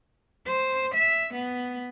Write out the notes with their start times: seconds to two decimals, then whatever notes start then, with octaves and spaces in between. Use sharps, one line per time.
0.46 C5
0.94 E5
1.33 B3